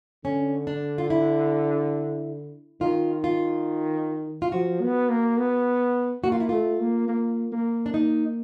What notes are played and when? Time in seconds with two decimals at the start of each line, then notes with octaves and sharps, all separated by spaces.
0.24 D3 C#4
0.67 D4
0.98 F4
1.10 E4
2.81 D#3 F4
3.24 F4
4.42 F4
4.52 F3 F#4
4.81 B3
5.09 A#3
5.38 B3
6.23 A#3 F#4
6.32 F4
6.40 E4
6.49 A3 F4
6.80 A#3
7.08 A#3
7.52 A#3
7.86 D4
7.94 A#3 D#4